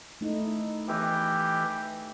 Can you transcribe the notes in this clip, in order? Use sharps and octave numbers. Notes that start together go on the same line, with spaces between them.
A3 D#4 E4
E3 G4 D#5 E5 G5